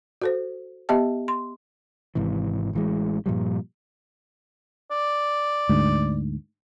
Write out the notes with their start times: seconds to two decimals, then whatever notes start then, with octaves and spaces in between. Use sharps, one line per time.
0.22 F#4 A4 C5
0.89 B3 G4 D#5 E5 A5
1.28 C6
2.15 G#1 G#2 C3 E3
2.73 A1 E3 G#3
3.26 G2 A#2 F3 G3
4.91 D5
5.69 D2 G#2